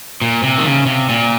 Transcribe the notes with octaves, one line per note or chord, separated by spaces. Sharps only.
A#2
C3
D#3
C#3
C3
A#2